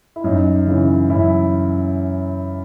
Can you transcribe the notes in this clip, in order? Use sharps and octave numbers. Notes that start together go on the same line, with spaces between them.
E4
F#2 D#4
C#3 E3
F#2 E4